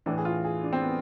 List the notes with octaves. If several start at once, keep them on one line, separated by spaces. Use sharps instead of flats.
A2 E3 D4
G#4
F4
G#4
D4
C4
B3